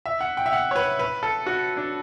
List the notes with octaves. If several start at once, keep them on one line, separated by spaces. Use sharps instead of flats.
E5
F#5
G5
E5
F#5
C#5
B4
B4
A4
F#4
D4